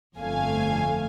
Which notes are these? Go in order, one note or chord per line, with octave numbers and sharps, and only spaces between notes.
G1 F2 D3 A3 F5 G#5